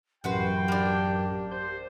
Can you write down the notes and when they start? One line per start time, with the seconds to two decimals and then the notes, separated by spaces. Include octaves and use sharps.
0.24 A1 F#2 F#4 G4 B4 G5 C6
0.68 A#3 D4
1.52 C5 G6